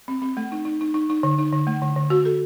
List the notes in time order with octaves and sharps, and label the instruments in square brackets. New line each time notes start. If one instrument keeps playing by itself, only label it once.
[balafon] C4
C4
A3
D#4
D#4
D#4
D#4
D#4
D3
D#4
D3
A3
D3
D3
F#4
A4